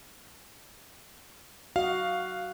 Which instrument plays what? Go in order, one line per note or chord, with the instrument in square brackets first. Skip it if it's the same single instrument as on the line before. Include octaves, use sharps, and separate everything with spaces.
[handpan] F#4 D#5 [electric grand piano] F5